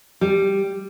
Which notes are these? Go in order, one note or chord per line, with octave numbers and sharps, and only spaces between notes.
G3